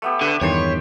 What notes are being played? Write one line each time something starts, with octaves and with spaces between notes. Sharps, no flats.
A3 B3 G4
D3 G4 B4
E2 G2 D#3 C#5 G5 A5 C6